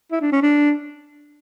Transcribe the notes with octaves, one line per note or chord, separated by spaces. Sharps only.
E4
D4
C#4
D4